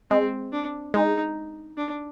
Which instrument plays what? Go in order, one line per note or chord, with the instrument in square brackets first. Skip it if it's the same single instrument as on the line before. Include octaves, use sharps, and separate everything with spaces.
[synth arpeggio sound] G#3 [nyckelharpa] C4
[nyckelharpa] D4
[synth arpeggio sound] G#3 [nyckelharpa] D#4
[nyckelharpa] D4